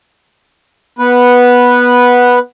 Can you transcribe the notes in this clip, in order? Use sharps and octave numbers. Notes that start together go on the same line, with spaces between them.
B3 B4